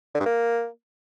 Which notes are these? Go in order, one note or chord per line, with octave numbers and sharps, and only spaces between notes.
D3
G2
A#3